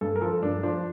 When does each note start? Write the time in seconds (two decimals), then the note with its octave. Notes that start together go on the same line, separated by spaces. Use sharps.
0.01 G2 A4
0.16 A#4
0.21 F3 A4
0.42 G2 D4
0.63 F3 D4